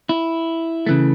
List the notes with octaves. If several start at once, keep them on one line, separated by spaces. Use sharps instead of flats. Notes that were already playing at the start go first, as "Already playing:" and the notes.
E4
C#3 E3 A3